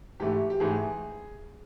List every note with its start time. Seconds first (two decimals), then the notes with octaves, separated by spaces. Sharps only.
0.20 G#2 E3 A3 G4
0.50 G4
0.60 G#2 E3 A3 G#4